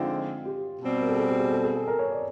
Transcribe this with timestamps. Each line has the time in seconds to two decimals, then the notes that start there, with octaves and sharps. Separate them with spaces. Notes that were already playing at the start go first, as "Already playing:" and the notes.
Already playing: D3 F3 G#3 C4 D#4 F4
0.45 G4
0.81 B2 G3 C4
1.01 A#4
1.08 A4
1.16 G#4
1.28 G4
1.40 G#4
1.52 A4
1.64 G#4
1.75 A4
1.88 A#4
1.99 C#5
2.11 D5